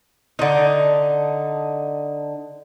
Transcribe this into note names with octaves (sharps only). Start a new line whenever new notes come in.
D3 D#4